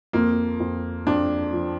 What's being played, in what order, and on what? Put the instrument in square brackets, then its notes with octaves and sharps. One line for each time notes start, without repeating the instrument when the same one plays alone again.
[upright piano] F2 [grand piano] A#3
[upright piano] F2
[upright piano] F2 [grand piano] D4
[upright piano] F3